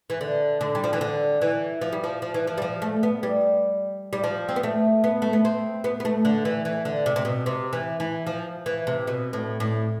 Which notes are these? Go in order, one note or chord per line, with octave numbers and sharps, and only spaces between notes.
E3
D3
D3
G3
F3
E3
D3
E3
F3
G3
F3
F3
E3
F3
G3
F3
A3
B3
G3
G3
F3
C4
B3
A3
B3
A3
B3
C4
B3
B3
A3
D3
E3
E3
D3
C3
C3
B2
C3
E3
E3
F3
E3
C3
B2
A2
A2